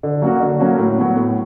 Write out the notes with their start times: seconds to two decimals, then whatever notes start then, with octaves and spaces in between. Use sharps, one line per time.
0.03 D3
0.22 F#3 A#3 C#4 F#4
0.40 D3
0.59 F#3 A#3 C#4 F#4
0.78 A2
0.98 F#3 B3
1.16 A2